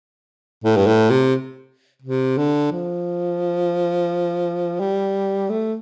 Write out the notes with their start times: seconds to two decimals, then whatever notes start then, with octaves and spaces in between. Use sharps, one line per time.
0.64 A2
0.77 G2
0.87 A2
1.10 C3
2.02 C3
2.38 D3
2.72 F3
4.80 G3
5.50 A3